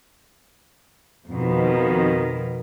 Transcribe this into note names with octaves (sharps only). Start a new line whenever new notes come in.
F2 B2 D#3